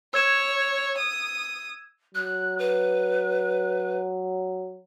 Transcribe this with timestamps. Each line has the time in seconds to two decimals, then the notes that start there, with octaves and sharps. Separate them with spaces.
0.14 C#5 E6 G#6 E7
0.98 D#6
2.15 F#3 F#6
2.58 B4